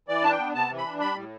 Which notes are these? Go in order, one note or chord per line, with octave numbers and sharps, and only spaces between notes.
E3 D5
D4 A5
G5
B3
C3 A5
E3
B5
D4
G3 B5
A2